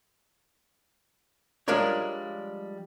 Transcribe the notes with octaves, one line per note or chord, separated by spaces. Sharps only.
F3 G3 G#3 D4 A#4 C#5